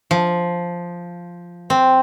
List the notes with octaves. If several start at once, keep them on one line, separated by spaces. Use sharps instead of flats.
F3
C4